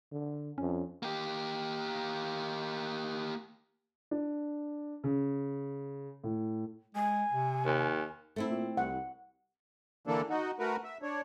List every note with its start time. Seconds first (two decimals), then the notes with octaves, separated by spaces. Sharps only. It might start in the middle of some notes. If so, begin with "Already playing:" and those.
0.12 D3
0.58 F2 C#4
1.03 A#3 G4
4.11 D4
5.04 C#3
6.24 A2
6.95 G#3 G#5
7.31 C3
7.65 D#2
8.36 A3 C4 E4
8.50 A#2
8.77 C2 F#5
10.07 D3 E3 A#3 D4 A4
10.29 D#4 F#4
10.59 A3 F#4 A#4 B4
10.84 E5
11.02 D4 C#5